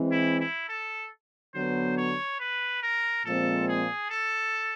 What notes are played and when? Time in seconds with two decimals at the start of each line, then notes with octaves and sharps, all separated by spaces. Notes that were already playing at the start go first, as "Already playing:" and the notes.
Already playing: E3 G#3 C4
0.12 E4
0.40 E4
0.69 A4
1.54 D3 F#3 B3 C5
1.97 C#5
2.40 B4
2.83 A#4
3.25 A#2 F3 G#3 C4 A4
3.68 G#4
4.10 A4